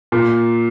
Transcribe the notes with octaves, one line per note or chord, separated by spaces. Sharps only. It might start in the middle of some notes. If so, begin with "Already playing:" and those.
A#2